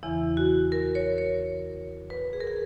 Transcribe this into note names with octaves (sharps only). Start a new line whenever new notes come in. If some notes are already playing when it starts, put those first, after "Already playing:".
E2 C#3 E3 E4
F#4
A#4
C#5
C#5
B4
G#4
A#4
G#4